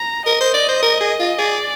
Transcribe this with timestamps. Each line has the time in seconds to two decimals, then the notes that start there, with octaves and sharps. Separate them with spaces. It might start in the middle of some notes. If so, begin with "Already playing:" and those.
Already playing: A#5
0.26 A#4 D#5
0.40 C5
0.54 D5
0.69 C5
0.83 A#4
1.01 G#4
1.19 F4
1.38 G#4 D5